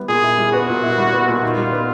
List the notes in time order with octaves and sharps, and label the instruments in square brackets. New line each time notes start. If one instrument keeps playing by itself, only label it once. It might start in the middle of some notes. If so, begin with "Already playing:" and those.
Already playing: [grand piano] G3 B3 E4
[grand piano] A#2 [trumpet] G#4
[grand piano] E4
G3
[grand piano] B3 [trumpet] F#4
[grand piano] A#2
E4
G3
B3
A#2
[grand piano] D#4 [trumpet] F4
[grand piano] G3
B3